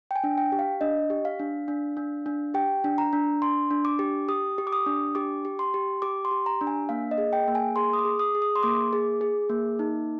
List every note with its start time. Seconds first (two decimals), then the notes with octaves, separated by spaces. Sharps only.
0.11 G5
0.16 G#5
0.24 D4
0.38 G5
0.52 G4
0.59 F5
0.81 D4 D#5
1.10 G4
1.25 F5
1.39 D4
1.68 D4
1.97 D4
2.26 D4
2.54 G4 G5
2.84 D4
2.98 A#5
3.13 D4
3.42 D4 C6
3.71 D4
3.85 D6
3.99 G4
4.29 G4 D#6
4.58 G4
4.67 D6
4.73 D#6
4.86 D4
5.15 G4 D6
5.45 G4
5.59 C6
5.74 G4
6.02 G4 D6
6.25 C6
6.31 G4
6.46 A#5
6.61 D4
6.67 G#5
6.89 A#3 F5
7.11 D#5
7.18 G#4
7.33 G5
7.48 A#3
7.55 G#5
7.76 G#4 C6
7.93 D#6
7.99 D6
8.05 G#4
8.19 D#6
8.35 G#4
8.42 D#6
8.56 C6
8.63 A#3 D6
8.93 G#4
9.21 G#4
9.50 A#3
9.79 D#4